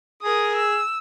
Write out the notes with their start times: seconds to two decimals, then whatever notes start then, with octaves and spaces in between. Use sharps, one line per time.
0.23 G#4 A#4 D#6
0.56 E6